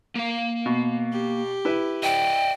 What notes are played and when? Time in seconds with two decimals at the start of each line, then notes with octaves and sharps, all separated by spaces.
0.15 A#3 F5
0.66 B2
1.12 G4
1.65 E4 B4
2.03 D5 D#5 G5